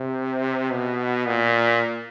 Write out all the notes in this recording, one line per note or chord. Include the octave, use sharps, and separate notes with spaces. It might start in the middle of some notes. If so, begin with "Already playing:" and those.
Already playing: C3
B2
A#2